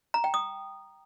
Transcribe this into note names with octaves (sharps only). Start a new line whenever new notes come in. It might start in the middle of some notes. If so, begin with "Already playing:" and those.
A#5
G5
D#6